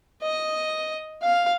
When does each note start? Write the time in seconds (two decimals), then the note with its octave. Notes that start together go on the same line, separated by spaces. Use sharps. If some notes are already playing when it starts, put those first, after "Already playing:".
0.22 D#5
1.23 F5